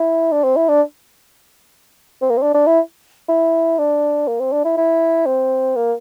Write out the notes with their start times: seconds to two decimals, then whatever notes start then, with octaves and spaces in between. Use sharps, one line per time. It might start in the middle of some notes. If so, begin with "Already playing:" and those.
Already playing: E4
0.32 D4
0.44 C4
0.56 E4
0.69 D4
2.22 C4
2.30 A#3
2.37 C4
2.42 D4
2.55 D4
2.67 E4
3.29 E4
3.78 D4
4.28 A#3
4.40 C4
4.52 D4
4.65 E4
4.77 E4
5.26 C4
5.76 A#3